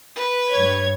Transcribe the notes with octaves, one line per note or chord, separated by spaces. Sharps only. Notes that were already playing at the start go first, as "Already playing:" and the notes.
B4
G2 C#5 G#6